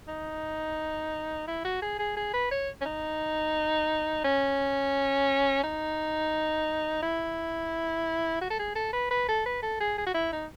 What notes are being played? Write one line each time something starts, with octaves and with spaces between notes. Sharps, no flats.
D#4
E4
F#4
G#4
G#4
G#4
B4
C#5
C#4
D#4
C#4
D#4
E4
F#4
A4
G#4
A4
B4
B4
A4
B4
A4
G#4
G#4
F#4
E4
D#4